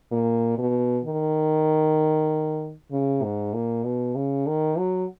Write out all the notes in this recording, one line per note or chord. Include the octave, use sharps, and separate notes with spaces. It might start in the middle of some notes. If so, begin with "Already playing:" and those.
A#2
B2
D#3
C#3
G#2
A#2
B2
C#3
D#3
F#3